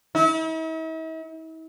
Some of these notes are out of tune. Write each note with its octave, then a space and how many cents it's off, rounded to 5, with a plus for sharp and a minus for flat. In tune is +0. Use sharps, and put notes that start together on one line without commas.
E4 -45